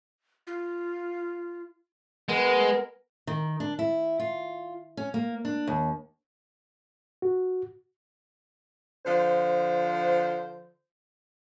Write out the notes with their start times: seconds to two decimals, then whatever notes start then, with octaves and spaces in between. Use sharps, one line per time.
0.47 F4
2.29 G#3 B3 A#4
3.27 D#3
3.60 D4
3.79 E4
4.20 F4
4.97 C#4
5.14 A#3
5.45 D4
5.67 D#2
7.22 F#4
9.06 D3 F3 C5